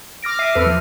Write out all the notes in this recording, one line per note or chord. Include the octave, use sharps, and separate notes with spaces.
D6 F6 A#6 D7
E5 D6 C7 D#7
E2 A4 B4 F6
F3